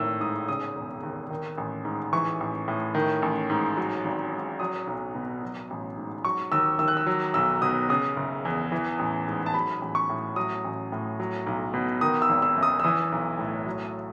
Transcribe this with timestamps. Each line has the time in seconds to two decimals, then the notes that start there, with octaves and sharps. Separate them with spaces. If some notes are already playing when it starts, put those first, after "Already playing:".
Already playing: G#1 A2 D#3 E6
0.20 G#2 D#6
0.48 C#3 D#6
0.75 E1
1.03 D#2
1.30 D#3
1.57 A1
1.85 G#2
2.13 E3 C#6
2.40 A1
2.68 A2
2.95 D#3
3.22 A1
3.50 G#2
3.77 F#3
4.05 G#1
4.32 G#2
4.60 F#3 D#6
4.87 B1
5.15 B2
5.43 F#3
5.70 A1
5.97 G#2
6.25 F#3 C#6
6.52 D#2 E6
6.79 D#3 E6
6.88 F#6
6.97 E6
7.07 F#3
7.34 B1 E6
7.62 B2 D#6
7.89 C#3 D#6
8.16 F#1
8.45 E2
8.72 E3
8.99 A1
9.27 G#2
9.46 A5
9.54 F#3 B5
9.81 A1
9.95 C#6
10.09 A2
10.36 F#3 D#6
10.64 A1
10.92 A2
11.20 F#3
11.47 B1
11.74 B2
12.01 D#3 D#6
12.22 E6
12.29 G#1
12.42 E6
12.56 F#2
12.63 D#6
12.80 E6
12.84 E3 D#6
13.12 B1
13.39 A2
13.66 F#3